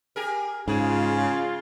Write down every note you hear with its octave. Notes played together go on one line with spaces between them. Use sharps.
G4 G#4 A#4
G#2 C#3 F4 G#4